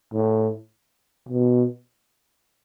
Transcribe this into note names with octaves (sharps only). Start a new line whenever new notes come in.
A2
B2